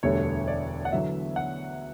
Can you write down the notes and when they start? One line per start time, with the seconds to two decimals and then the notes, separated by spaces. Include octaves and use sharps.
0.03 E1 D2 D3 G3 C#5
0.48 D5
0.85 F#5
0.92 E2 D3 F#3 E5
1.36 F#5